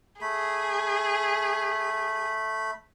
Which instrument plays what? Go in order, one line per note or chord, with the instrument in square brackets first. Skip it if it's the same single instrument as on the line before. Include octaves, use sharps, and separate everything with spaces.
[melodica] A3 B5 [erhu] G#4